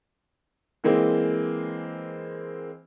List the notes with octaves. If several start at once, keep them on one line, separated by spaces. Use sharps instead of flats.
E3 G#3 A#3 C4